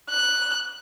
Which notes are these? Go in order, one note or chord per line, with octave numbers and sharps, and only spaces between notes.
F#6